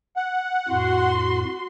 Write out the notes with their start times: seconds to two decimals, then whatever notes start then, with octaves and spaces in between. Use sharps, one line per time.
0.16 F#5
0.69 F2 A2 F#4 C6